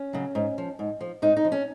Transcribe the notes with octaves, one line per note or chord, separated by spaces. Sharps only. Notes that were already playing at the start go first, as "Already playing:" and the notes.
Already playing: C#4
C#3 F#3
G#2
F3
G#2
F3
G#2 D#4
D#4
F3
C#4